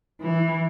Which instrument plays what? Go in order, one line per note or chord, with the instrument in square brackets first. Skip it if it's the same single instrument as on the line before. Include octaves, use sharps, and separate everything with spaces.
[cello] E3